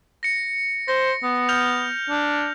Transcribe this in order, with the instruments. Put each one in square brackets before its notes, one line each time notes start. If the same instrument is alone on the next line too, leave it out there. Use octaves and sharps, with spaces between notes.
[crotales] A#6 C#7
[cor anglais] C5 [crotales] A#6
[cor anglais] B3
[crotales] F6 G6 F7
[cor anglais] D4